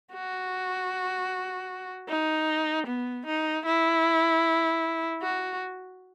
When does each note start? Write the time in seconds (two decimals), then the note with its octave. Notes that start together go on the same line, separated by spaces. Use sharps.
0.13 F#4
2.09 D#4
2.87 B3
3.26 D#4
3.66 E4
5.22 F#4